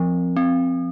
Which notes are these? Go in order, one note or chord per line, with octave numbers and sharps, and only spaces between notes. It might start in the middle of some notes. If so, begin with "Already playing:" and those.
Already playing: F3 C4
C4